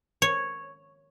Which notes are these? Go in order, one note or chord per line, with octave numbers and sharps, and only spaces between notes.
C#5